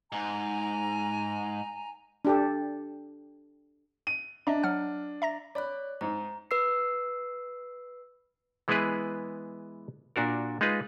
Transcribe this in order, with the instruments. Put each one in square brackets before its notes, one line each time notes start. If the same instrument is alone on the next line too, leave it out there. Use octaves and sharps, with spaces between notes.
[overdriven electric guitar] G#2 [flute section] G#5 A#5
[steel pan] D4 G4 A4
[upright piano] D#7
[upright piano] D4 [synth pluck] D#5 E5 A#5
[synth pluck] F#3 F#5 F6
E5 A#5 A#6
[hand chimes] C#5 F#6 [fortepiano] D5 B5
[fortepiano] G#2 D#4 [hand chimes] A#5
[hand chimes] B4 E6 C7
[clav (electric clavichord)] E3 G#3 B3 E4 G#4 B4
A#2 D4 F#4 A#4
G#3 D#4 F4 G#4 B4